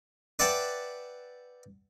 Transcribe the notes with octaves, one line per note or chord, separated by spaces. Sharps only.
B4 D5 E5 F#5 G5 A5